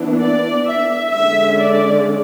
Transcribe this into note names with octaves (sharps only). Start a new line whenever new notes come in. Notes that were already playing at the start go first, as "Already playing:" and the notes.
Already playing: E3 B3 D4
D5
E5
D3 G#3 C#4 E5
D5